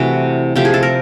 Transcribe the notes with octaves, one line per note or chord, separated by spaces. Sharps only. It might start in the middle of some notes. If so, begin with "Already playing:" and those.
Already playing: C3 E3 A3 F#4
C3 F3 A3 G4
G#4
A4
A#4